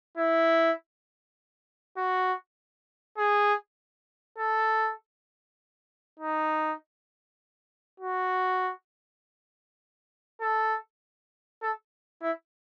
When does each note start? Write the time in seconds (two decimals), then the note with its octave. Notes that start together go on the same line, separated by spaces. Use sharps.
0.18 E4
1.97 F#4
3.18 G#4
4.39 A4
6.20 D#4
8.00 F#4
10.41 A4
11.62 A4
12.22 E4